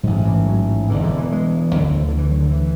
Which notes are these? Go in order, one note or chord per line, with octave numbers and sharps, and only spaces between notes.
A1 G#2 F#3
E3
F#3
E1 E2 D3 E3
D3
E3
G#3
D2 D3 F#3
E3
E3
D3
E3
F#3
D3
E3